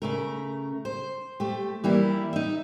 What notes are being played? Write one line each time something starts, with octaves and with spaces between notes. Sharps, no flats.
C#3 A3 A#4
C5
A3 G4
E3 G3 A#3 E4
D#4 E5